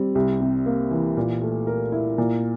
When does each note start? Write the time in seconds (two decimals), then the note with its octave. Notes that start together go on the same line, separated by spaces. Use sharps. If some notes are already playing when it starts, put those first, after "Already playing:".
Already playing: G3 C4
0.15 C2
0.40 C3
0.66 A#3
0.91 E3
1.17 A#2
1.42 A3
1.67 A#4
1.92 E4
2.18 A#2